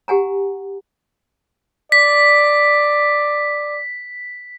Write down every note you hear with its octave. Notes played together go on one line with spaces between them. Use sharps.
G4 F#5 G#5 A#5
D5 B6